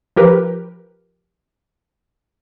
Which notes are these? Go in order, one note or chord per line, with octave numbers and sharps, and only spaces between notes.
F3 G4 A#4 B4